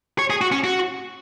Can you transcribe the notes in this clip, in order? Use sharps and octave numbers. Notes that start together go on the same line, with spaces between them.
C#5
G#4
F#4
C#4
F#4